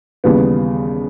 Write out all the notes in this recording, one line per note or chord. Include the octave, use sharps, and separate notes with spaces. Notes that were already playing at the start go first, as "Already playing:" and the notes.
D#2 C#3 E3 G3 B3